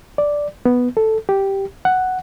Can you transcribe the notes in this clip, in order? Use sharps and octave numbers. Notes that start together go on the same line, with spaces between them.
D5
B3
A4
G4
F#5